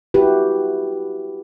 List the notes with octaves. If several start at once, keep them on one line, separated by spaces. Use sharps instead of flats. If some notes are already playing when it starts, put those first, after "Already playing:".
E4 F#4 G4 B4